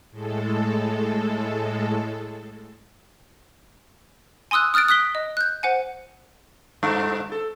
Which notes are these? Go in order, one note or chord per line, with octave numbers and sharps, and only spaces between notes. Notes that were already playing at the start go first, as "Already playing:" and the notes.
A2 G#3 A4
G#5 C6 D#6 E6 F#6
D#6 F6 F#6 A6 D7
D#6 F#6 B6 G7
D#5
F#6 G6
C5 F#5 G#5
G2
A4